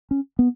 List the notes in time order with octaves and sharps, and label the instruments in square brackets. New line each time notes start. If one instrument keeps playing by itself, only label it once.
[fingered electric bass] C#4
B3